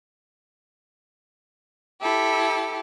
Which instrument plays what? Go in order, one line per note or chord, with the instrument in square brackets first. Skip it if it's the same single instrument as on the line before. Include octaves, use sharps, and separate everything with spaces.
[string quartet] E4 G4 A4